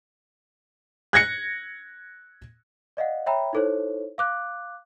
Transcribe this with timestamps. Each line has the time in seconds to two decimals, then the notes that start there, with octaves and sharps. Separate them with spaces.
1.13 F#6 G#6 A#6 C#7
2.97 D5 D#5 F5 F#5
3.26 C#5 E5 G5 A#5 B5
3.53 D#4 E4 A4 C5 C#5
4.18 F5 D6 F#6